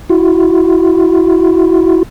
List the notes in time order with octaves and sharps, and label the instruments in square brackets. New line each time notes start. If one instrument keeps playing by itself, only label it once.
[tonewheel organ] E4 F#4